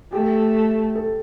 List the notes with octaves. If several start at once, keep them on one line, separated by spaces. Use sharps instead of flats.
A3 G4
A4